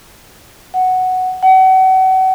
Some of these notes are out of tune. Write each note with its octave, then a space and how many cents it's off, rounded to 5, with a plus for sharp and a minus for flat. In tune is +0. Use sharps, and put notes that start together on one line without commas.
F#5 +0
F#5 +35